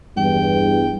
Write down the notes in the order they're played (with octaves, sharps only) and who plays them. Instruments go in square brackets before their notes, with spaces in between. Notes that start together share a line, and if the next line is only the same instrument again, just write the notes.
[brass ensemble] E2 G2 [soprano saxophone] G5